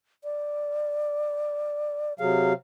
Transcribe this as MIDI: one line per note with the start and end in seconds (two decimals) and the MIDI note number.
0.24 2.13 74
2.19 2.53 48
2.19 2.53 54
2.19 2.51 68
2.19 2.53 77